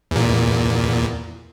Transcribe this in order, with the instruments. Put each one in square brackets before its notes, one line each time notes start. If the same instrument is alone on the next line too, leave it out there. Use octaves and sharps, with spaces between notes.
[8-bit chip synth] E2 A#2